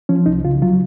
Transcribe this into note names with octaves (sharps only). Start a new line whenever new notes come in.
F3 C#4
C2 D#4
C#3 F4
F#3 F4